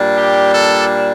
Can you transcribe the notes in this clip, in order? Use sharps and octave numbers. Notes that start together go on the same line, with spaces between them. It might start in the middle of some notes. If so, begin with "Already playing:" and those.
Already playing: A#2 G3 D4
G4
A4